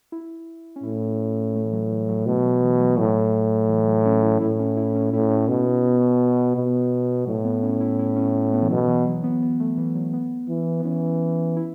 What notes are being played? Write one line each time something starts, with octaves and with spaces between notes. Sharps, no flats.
E4
C#4
A2 E4
A3
E3
F#3
E3
F#3
B2 A3
F#3
E3
F#3
A2 F#3
E3
F#3
C#4
E4
A2 E4
C#4
E4
C#4
A2 E4
C#4
B2 C#4
B3
B2
A2 F#3
B3
C#4
E4
E4
C#4
B3
E3
B2 F#3
E3
F#3
B3
B3
A3
E3
F#3
B3
E3
B3
E3 C#4
E4